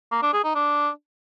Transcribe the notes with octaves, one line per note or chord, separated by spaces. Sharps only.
A#3
D4
G#4
D#4
D4